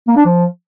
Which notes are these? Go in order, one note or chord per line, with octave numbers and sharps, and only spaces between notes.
A#3
D4
F3